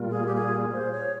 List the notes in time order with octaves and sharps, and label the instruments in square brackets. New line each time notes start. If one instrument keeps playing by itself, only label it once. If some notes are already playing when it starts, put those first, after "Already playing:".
Already playing: [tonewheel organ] A#2 G3 A#3 F4
[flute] G#4
G4
G#4
C5
C#5